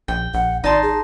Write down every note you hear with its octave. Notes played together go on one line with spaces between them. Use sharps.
A#1 G5
A#1 F#5
G#1 D#4 D5 A5 C6
G#4